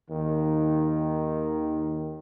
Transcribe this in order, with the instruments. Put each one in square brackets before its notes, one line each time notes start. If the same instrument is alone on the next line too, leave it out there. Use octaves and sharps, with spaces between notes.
[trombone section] D#2 D#3